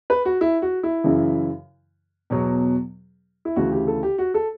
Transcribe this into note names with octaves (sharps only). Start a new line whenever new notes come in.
B4
F#4
E4
F#4
E4
F#2 C#3 E3
E2 B2 F#3
E4
D2 C#3 E3 F#4
G4
A4
G4
F#4
A4